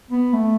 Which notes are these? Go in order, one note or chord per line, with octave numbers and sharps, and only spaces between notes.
B3
A3